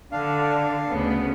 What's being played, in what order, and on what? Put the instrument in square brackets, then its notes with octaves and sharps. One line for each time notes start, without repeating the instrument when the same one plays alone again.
[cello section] D3 [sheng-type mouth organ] D4 F5
[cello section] D2 C#3 B3